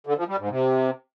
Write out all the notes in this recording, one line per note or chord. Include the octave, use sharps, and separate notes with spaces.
D3
F3
G3
G#2
C3